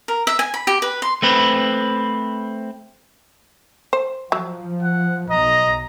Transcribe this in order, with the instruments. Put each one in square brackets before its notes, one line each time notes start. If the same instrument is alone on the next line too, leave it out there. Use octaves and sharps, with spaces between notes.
[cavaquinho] A#4
E5
G#5
B5
G4
B4
C6
[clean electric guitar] A3 C4 B4
[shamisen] C5
[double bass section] F3 [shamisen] F#3
[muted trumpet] F#5
[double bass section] B1 [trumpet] D#5 [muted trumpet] A#5